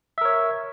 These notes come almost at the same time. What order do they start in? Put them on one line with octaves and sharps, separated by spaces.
E5 A#4 C#5